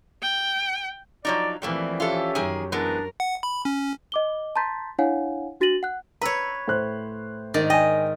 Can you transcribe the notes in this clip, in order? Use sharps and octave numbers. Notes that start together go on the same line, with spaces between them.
G5
F3 F#3 D#4 D5
E3 F3 G3 A3 A#3 C4
C#4 F4 G4 A4 E5
F#2 D#3 G#4 G#5
E3 G#3 B3 D4 A#4
F#5
B5
C#4
D#5 D6 G7
A5 A#5 C6 G6 A6 B6
D4 E4 C#5 F5 F#5 G#5
D4 F#4 A6 A#6 D#7 F#7
F#5 F#6
B4 C#5 A#5 E6
A2 C5 F#6
G#2 D#3 D5
D#5 G5 G#5